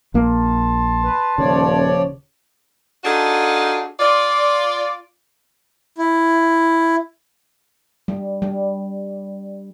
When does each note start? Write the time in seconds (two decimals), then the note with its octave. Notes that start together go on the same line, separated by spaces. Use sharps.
0.14 A#1 A#3 A5 C6
1.03 B4
1.38 D#1 C#3 F3 C#5 D5
3.04 D4 D#4 F4 F#4 G#4 A4
4.00 F4 D5
5.98 E4
8.08 G3
8.42 G3